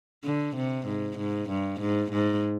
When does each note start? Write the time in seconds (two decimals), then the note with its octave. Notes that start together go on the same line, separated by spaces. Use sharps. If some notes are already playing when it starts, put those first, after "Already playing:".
0.24 D3
0.56 C3
0.87 G#2
1.18 G#2
1.49 G2
1.80 G#2
2.12 G#2